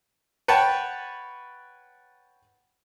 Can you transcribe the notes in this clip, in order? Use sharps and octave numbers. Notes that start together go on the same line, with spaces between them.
B4 C#5 F#5 G5 A5